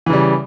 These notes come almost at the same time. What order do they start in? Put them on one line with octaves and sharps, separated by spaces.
E3 C#3 G3